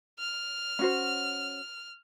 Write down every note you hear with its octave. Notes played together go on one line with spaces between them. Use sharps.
F6
C#4 F#4 C5